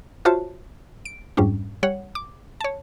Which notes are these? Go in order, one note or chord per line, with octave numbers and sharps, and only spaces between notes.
F4 F#4 C5 C#5 E5 A5
D7
F2 G#2 G3 C#4 D4
G3 C#5 F#5
D6
C#5 A5